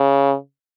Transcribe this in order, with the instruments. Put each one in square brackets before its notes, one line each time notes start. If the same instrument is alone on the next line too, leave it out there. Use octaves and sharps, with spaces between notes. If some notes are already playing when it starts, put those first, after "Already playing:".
Already playing: [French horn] C#3